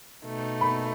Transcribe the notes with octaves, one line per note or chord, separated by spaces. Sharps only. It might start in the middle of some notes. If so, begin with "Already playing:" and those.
B2 A3 D#4
B5